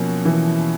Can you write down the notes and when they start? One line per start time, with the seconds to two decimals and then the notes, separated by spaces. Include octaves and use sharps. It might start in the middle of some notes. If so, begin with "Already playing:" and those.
Already playing: B2 F3 F#3 A#3 C#4
0.25 E3